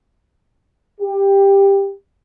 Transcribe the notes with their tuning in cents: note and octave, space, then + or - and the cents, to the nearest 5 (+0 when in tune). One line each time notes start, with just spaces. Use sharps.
G4 +10